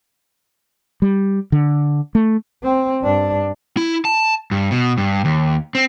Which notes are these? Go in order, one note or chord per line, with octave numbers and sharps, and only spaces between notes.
G3
D3
A3
C4
G2 D4
E4
A5
G2
B2
G2
D#2
C4